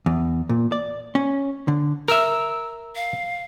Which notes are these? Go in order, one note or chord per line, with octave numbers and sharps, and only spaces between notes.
E2
A#2
D5
C#4
D3
A#4 E5 E6
F5